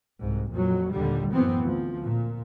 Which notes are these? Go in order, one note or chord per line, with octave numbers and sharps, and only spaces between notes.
C2 G#2
F2 A#2 F#3
D#2 A#2 D3 G3
F#2 A2 E3 B3 C4
D2 F3
A#2